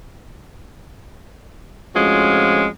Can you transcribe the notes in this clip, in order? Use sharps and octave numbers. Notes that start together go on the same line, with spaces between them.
F2 A2 F3 G#3 C#4 F#4